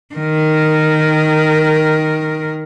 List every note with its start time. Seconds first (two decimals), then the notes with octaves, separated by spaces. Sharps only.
0.15 D#3 A#4